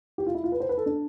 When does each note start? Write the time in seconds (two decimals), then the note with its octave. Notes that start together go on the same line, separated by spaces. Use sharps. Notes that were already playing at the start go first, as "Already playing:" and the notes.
0.18 G4
0.26 F4
0.35 E4
0.44 F4
0.52 B4
0.60 C5
0.69 B4
0.78 A4
0.86 D4